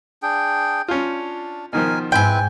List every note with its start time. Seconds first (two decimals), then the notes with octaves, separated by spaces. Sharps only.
0.23 D4 G#4 G5
0.88 C#4 D4 F4
1.73 B2 D#3 F3 A#4 G#5
2.12 G#2 C4 E4 B4 G5 G#5